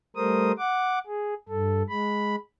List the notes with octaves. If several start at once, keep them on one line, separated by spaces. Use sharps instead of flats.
G3 A3 A#4 C5 D#6
F#5 D6
G#4
G2 A4
G#3 B5